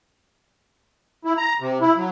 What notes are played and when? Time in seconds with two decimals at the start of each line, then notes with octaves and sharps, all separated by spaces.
1.25 E4
1.37 A#5
1.60 C3
1.81 E4
1.97 F#3